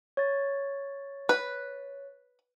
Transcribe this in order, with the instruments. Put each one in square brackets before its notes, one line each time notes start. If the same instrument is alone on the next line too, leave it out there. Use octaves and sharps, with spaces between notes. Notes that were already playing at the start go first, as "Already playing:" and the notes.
[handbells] C#5 A6
[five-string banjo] B4